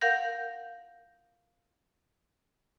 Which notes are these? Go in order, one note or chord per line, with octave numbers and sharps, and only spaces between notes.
A#4 F5 F#5 G6 A#6